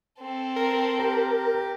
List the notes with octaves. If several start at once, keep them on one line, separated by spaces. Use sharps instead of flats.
C4 A4
A#4
G4 A#4